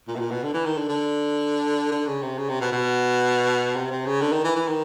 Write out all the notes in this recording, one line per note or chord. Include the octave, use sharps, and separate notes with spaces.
A#2
B2
A#2
B2
D3
E3
D#3
D3
D3
D3
C#3
C3
C#3
C3
B2
B2
C3
C3
C#3
D3
D#3
E3
E3
D#3